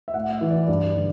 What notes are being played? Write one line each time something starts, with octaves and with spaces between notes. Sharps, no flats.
E5
A2 F#5
E5
E3
D5
G2 D5
D3